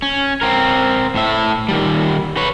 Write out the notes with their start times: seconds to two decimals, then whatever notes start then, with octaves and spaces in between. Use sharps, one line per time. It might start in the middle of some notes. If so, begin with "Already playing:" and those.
0.02 C#4
0.41 C4 A#4
1.15 A2 E5
1.69 D#3 G3
2.37 B4 C#5